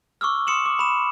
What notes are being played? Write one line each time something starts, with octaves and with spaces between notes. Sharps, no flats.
C#6 D6 E6 F6
C6 D#6 C#7 E7 F#7
D6
B5 E7